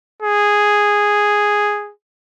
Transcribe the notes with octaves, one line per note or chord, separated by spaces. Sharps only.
G#4